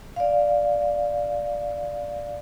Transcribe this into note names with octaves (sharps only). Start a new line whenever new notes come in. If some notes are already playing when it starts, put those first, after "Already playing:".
D5 F5